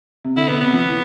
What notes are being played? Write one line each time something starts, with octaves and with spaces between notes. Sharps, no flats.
C3
D3 E4
B2 B3
C3 B3
F3
E3